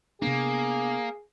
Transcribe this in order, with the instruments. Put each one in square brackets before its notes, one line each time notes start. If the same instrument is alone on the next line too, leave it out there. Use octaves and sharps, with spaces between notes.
[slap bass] C3 B3 D4 [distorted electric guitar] A#3 [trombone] G#4